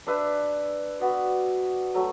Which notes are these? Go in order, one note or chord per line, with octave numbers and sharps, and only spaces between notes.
D4 B4 E5
B3 F#4 D5
F#3 A3